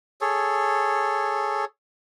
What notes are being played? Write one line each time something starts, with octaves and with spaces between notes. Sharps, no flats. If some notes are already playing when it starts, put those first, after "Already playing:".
G#4 A4 C#5